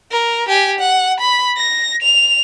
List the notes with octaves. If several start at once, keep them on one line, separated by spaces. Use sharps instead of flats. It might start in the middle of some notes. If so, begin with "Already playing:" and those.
A#4
G4 G#5
F#5
B5
A#6
F7